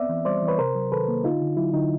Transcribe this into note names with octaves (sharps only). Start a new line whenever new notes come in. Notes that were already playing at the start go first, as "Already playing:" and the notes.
Already playing: B3 C4 D5 E5
E3
G3 C5 D5
E3
B4 C#5
C3 A#4 C5
F#3
D#3 A4 B4
A#3
D3 D#4 F4
D3
F#3 E4
D3 D#4